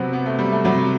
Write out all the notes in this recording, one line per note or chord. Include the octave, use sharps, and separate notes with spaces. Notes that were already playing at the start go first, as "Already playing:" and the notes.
Already playing: C3 F#3 B3 C4
B3
A3
G3
A3
C3 F#3 G3